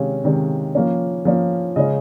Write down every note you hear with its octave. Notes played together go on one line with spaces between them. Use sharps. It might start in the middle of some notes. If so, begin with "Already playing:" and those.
Already playing: C3 D#3 G#3 C#4 F5
C3 D#3 G#3 C#4
F3 A#3 C#4
F3 A#3 C#4
C#3 G#3 C#4 D#5